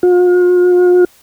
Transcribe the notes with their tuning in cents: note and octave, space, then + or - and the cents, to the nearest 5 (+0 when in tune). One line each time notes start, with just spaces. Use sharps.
F4 +45